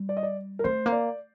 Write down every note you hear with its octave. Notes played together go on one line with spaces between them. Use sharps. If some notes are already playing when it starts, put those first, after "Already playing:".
Already playing: G3
D5
D#5
D5
A#4
A3 C5
A#3
D5